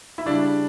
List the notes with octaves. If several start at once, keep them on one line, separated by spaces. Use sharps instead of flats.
E4
C#3 G3 D4